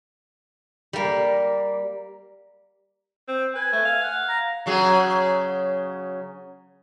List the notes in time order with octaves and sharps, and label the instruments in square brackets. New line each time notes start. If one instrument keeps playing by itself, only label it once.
[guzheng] G3 A#3
[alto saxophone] C4
[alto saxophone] B4 [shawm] G#5
[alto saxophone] A3
F5
[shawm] F#5
A#5
[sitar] C#3 F#3 G#4